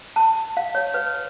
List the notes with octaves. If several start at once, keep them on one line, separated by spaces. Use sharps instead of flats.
A5
F5
C#5
B4